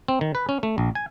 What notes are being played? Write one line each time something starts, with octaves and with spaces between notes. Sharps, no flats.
C4
D#3
B4
C#4
A3
A#1
G#5